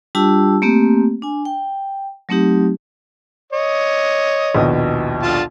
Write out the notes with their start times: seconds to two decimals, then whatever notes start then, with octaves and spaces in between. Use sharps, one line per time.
0.15 G3 D4 F4 G4 A5 E6
0.62 A3 A#3 C4 G4
1.22 D4 G#5
1.45 G5
2.29 F#3 A3 C4 D#4 G4
3.53 C#5 D#5
4.55 A#1 D#2 B2
5.23 D3 F4 A5